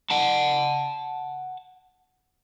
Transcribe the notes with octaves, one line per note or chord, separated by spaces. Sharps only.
F#5 A5